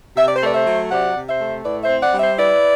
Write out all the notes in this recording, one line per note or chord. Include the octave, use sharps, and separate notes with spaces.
C3 E5
D5
C5
A3 B4 D5
C5 E5
F#3
C3 D5 F#5
C3
C5 E5
A3
A2 B4 D5
C5 E5
C4
D5 F#5
G3
C5 E5
E4 B4 D5